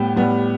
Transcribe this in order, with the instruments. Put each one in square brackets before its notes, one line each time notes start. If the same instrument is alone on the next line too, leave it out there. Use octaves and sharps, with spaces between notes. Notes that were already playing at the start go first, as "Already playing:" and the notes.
Already playing: [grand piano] A2 G3 B3 [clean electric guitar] G4
[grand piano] A2 G3 B3